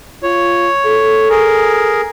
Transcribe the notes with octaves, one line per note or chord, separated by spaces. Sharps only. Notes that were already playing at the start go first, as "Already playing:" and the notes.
F4 C#5
A4
G#4 A#4